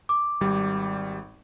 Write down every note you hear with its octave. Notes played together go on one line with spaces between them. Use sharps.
D6
G#1 G3